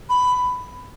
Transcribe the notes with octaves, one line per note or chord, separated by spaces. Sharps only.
B5